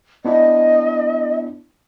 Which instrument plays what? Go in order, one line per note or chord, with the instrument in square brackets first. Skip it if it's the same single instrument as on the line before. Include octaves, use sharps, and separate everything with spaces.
[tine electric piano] B3 D4 E4 [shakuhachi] D#5